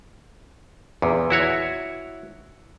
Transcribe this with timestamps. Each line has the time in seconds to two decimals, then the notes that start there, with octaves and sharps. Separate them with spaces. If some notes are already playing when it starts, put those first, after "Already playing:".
1.02 E2 A#2
1.30 E4 F#4 C#5